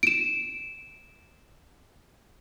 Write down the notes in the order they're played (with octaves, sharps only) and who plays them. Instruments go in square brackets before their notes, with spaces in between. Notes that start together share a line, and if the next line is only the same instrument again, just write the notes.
[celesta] D7 E7